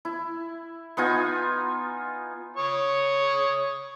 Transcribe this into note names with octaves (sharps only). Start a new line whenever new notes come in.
E4
B3 D#4 F4 G#5
C#5 C#6 D#6